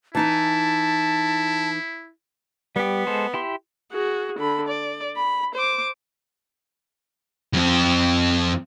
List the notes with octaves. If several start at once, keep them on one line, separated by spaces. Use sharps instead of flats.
E3 D#4 E4 G#5 A5
G3 B3 G4
G#3 A4 C5
E4 G4 C6
F#4 G#4
D3 B5
D5
B5
C5 D6
F2 C4